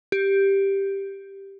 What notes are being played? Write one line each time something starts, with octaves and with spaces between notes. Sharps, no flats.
G4